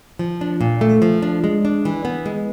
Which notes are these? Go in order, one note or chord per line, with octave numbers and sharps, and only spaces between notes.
F3
D4
A#2
A3
F3
D4
G#3
D4
E3
B3
G#3